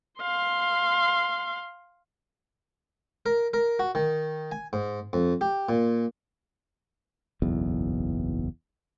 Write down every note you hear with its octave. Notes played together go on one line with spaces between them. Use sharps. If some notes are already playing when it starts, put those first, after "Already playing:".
F5 C6
A#4
A#4
F#4
D#3
G#5
G#2
F2
G4
A#2
F#1 B1 E2